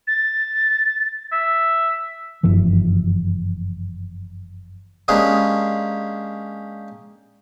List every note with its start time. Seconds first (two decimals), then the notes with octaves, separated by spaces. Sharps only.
0.07 A6
1.32 E5
2.43 F#1 G2 E3 F3
5.08 G#3 A#3 C#4 D4 G4 G#4